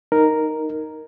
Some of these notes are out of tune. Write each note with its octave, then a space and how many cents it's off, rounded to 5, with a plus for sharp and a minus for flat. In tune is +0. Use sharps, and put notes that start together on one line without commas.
D#4 +0 A#4 +0